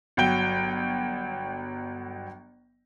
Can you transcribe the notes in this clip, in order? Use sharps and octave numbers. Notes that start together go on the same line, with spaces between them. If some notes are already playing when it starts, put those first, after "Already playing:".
G1 F#3 G5 G7